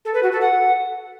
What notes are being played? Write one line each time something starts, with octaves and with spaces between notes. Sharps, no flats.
A4
B4
F#4
A4
F#5